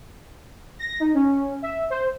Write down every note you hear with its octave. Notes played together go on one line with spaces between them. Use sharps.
A#6
D#4
C#4
E5
C5